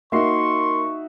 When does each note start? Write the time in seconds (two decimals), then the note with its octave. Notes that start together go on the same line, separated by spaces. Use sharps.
0.12 A#3 D#4 F#4 E5 C6 C#6 C7